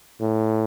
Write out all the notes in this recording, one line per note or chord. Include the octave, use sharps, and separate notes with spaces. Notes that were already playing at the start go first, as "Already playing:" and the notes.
A2